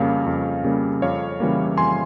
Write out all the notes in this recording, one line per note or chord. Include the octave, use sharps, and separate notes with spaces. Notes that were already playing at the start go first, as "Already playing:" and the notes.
Already playing: F2 C#3 G3 A#3 C#5 F5
F2
C#3 G3 A#3
F2 C#5 F5
C#3 E3 G3 A#3
F2 G#5 C6